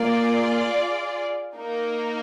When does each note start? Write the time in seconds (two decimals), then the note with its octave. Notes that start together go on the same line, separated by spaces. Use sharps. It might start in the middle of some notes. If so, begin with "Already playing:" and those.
Already playing: A#3 F4 G#4 D5
1.56 A#3 D#4 A#4